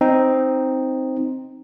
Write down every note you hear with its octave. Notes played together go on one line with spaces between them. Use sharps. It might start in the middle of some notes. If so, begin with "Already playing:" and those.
C4 D#4